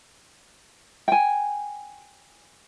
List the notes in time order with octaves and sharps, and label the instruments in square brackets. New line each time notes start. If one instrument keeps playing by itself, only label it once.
[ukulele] G5 G#5